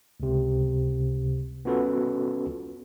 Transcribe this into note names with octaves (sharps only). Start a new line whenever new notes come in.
C#2 C3
B3 C#4 F4 F#4 A4 B4